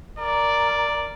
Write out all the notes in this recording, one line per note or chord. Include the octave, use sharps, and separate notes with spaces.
A#4 D5